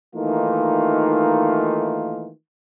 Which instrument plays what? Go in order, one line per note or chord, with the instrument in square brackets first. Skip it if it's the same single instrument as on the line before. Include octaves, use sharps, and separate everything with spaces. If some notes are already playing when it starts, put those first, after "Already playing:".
[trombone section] D#3 E3 A3 A#3 D#4 F4